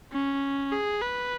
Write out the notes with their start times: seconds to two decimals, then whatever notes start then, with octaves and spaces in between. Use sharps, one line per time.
0.12 C#4
0.72 G#4
1.02 B4